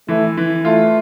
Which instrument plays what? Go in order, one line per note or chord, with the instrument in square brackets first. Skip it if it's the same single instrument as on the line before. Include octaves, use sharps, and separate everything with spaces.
[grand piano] E3 [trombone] A3
[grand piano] E3
[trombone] A3 [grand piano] F4